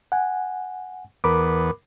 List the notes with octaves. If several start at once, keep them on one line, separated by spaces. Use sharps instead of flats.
F#5 G#5
E2 B3 A#4 B5 D6